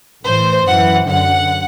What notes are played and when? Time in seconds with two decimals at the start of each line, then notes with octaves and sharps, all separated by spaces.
0.24 A2 E3 C5
0.67 F#2 E3 F#5
1.08 F#2 D3 F#5